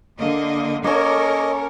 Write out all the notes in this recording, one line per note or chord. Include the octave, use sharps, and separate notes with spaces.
D3 A#3 D#5
A#3 C#4 A4 A#4 C#5 D#5